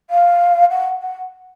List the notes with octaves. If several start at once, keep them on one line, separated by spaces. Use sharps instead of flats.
F5
F#5
F#5